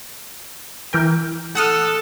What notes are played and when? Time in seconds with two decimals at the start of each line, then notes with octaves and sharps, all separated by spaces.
0.93 E3 A#4 G5
1.55 A4 F#5 D#6 F6